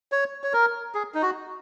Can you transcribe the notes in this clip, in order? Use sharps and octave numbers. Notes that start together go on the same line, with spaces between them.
C#5
C#5
A#4
G#4
D#4
F#4